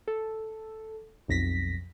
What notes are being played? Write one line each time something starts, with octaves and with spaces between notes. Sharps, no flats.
A4
B1 F2 A#6 B6